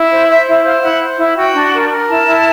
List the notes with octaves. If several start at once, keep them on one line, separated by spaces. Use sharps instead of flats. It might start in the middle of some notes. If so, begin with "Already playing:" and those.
Already playing: E4
C5
C5 E5
E4
C5 F5
E4 F#5
C5
E4
F#4 G5
D4
A#4
A#4
E4 A5
E4